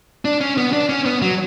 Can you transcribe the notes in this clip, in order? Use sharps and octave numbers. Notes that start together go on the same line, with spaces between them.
D4
C#4
B3
D4
C#4
B3
F#3